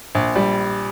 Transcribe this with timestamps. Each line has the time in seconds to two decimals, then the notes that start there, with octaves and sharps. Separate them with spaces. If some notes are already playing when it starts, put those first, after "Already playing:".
0.15 A#1
0.36 G3